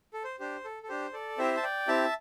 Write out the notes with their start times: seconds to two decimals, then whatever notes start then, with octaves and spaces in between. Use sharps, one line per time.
0.14 A4
0.24 C5
0.39 D4 G4 C5
0.65 A4
0.83 A4
0.89 D4 G4 C5
1.13 A4 D5
1.38 C4 E4 G4 C5 E5
1.57 A5
1.63 D5 G5
1.87 C4 E4 G4 E5 A5